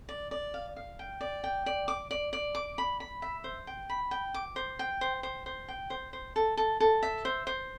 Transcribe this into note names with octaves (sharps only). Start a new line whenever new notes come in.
D5
D5
F5
F5
G5
D5
G5
D5
D6
D5
D5
D6
B5
B5
E5
C5
G5
B5
G5
D6
C5
G5
C5
C5
C5
G5
C5
C5
A4
A4
A4
E5
C5
C5